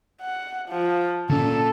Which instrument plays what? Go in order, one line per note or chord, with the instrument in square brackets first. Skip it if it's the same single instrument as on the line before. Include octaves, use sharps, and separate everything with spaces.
[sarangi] F#5
F3
[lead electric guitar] A#2 [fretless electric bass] D3 C#4 [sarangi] A4